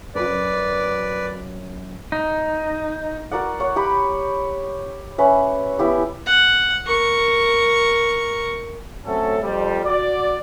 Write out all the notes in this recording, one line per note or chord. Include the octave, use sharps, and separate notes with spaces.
F#2 B4 D5
D#4
F#4 A#4 D5 F#5
C#5 F#5
G4 G5 B5
C#4 B4 E5
B3 E4 G4 B4
F#5
A#4 C#6
F#3 A3 C4 C#4 A4
F2 G3
F#4 D5